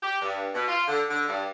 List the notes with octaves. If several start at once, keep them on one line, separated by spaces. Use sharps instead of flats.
G4
G2
B2
F4
D3
D3
G2